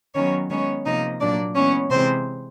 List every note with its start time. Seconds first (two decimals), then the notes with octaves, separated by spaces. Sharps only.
0.14 D#3 F#3 B3 C#4 C#5
0.49 D#3 G#3 B3 C#4 C#5
0.85 C3 F3 A#3 D#4 D#5
1.20 A#2 F#3 A#3 D4 D5
1.55 E3 G#3 B3 C#4 C#5
1.90 C3 E3 G#3 C4 C5